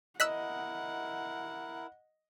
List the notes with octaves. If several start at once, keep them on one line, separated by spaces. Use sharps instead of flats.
E4 A#4 D#5 F#5 E6 F#6 B6